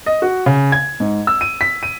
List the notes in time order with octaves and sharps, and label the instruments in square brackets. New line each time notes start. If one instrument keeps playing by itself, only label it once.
[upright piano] D#5
F#4
C#3
G#6
G#2
E6
D#7
B6
D#7